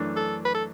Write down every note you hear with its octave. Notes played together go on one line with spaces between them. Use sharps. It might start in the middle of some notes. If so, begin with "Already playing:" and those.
Already playing: F#2 E3 A3 D4
A4
B4
A4